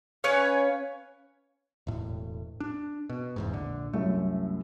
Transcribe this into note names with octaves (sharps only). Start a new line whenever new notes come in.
C#4 B4 C#5 F5
E1 A2
D4
B2
F1 E2 G#2
A#1 D3
C2 F#2 A3